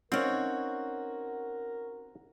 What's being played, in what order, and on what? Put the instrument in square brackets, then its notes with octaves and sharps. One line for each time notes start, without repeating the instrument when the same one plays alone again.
[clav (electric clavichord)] C4 D5 F5 [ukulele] C#4 D#4 [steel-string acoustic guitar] F#4 C#5 [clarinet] A#4